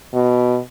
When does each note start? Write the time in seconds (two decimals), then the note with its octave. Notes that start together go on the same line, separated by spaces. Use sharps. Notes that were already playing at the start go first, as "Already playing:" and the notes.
0.14 B2